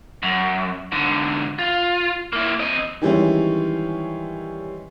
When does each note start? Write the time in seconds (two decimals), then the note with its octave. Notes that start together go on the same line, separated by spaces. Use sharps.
0.23 F#2
0.92 G#2 D3
1.59 F4
2.33 A#3 E4
2.60 C4 D#5
3.02 D#3 E3 G3 G#3 C#4